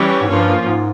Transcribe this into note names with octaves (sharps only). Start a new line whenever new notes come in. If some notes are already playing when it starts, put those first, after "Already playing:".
Already playing: E3 G3 C#4 G4 C#5
G#2
G2 F3 A#3 C#4 F4
G#2